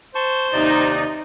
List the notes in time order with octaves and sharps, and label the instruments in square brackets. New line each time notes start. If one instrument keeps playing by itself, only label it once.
[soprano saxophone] C5 [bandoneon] A5 C#6
[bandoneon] D#2 C3 D5 [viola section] D#4